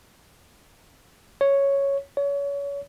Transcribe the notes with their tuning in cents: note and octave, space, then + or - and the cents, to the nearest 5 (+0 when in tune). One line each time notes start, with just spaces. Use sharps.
C#5 +0
C#5 +30